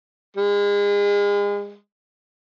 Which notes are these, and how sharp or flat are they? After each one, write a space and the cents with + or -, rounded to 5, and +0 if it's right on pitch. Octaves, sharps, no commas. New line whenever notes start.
G#3 -35